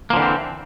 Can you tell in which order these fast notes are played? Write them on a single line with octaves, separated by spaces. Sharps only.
A#3 F3 D3 E3 C4